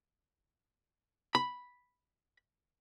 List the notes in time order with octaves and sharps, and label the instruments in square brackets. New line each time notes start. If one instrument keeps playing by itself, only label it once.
[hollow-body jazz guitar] B5